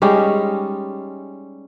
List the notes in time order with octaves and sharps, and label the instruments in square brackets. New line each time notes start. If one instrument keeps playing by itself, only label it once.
[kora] G3 G#3 C#4 D#4